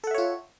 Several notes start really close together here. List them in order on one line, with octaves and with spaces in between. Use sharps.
A4 F#5 E5 C#5 F4